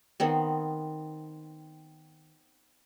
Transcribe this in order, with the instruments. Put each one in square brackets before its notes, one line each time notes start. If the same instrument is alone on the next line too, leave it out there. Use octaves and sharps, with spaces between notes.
[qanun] D#3 B3 C4